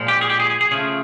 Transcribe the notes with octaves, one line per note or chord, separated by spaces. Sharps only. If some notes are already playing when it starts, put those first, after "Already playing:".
Already playing: A#2 F3 G#3
G4
G#4
G4
G#4
G#4
G#4
C#3 F3 A3 G#4